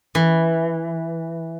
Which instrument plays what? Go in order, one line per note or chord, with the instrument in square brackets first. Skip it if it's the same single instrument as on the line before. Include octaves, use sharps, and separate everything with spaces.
[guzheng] E3